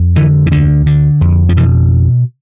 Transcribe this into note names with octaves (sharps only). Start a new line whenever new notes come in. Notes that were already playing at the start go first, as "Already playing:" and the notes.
Already playing: F2
D3 E3
E3
D2 D3
D3
F2
F3
B2 E3